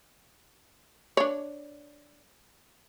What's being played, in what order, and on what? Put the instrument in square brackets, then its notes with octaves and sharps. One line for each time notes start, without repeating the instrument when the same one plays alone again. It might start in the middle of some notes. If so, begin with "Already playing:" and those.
[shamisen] D4 C#5